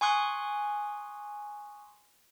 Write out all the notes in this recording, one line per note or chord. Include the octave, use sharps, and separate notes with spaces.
G#5 C6 C#6 D#6 F#6